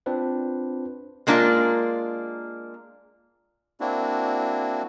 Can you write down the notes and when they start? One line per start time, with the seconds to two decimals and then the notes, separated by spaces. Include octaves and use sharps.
0.06 C4 D4 F4 B4 C5
1.27 G#3 A#3 D4 F4
3.80 A#3 C4 D4 E4 F#4